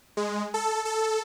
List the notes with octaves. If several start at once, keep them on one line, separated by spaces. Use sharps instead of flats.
G#3
A4
A4